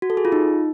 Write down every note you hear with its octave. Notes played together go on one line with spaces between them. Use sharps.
F#4
A4
G#4
F4
D#4